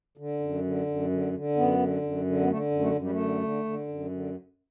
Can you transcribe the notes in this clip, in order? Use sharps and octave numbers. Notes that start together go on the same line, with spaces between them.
D3
F#2
D3
F#2
D3
D3
F#2 B3
D3
F#2
D3
B3
D3 A3
F#2
A3
F#2
G3
A3
D3
D3
D3
F#2
D3